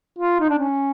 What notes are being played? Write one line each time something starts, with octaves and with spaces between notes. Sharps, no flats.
F4
D#4
D4
C#4